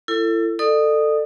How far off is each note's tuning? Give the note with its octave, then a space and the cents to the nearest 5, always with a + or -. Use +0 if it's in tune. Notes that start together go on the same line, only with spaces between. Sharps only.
E4 +30 A4 +30
A4 +15 D5 +40 D#6 -5